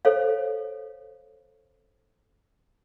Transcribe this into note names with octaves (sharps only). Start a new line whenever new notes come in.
A4 C5 C#5 F5